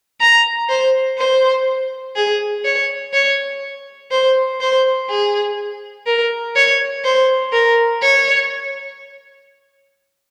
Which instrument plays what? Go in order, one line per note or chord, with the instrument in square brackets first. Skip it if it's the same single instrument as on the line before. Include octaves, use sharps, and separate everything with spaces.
[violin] A#5
C5
C5
G#4
C#5
C#5
C5
C5
G#4
A#4
C#5
C5
A#4
C#5